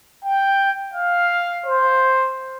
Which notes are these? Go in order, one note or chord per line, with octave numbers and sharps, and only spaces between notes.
G5
F5
C5